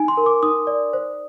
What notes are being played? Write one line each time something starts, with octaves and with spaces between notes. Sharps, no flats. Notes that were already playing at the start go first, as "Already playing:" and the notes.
Already playing: D#4 G#5
C6
A#4
D6
D#4 D#6
D5
C5